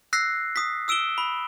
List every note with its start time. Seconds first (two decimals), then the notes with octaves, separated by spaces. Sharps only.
0.13 E6 F#6 A#6 C7
0.56 D#6 B6
0.88 D#6 E6 D7 E7 G7
1.18 B5